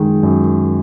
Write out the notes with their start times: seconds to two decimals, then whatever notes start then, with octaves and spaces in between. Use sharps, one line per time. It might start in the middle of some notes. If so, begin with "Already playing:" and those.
Already playing: F#2 D#3 G#3
0.23 F#2